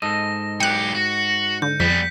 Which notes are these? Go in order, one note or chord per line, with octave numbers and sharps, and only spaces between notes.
G#2 A4 D#5 A#6
B1 G4 G5 F#6 C#7
F#4
D3 G6
F2 G3 B3 B6